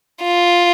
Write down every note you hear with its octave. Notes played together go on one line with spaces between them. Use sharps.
F4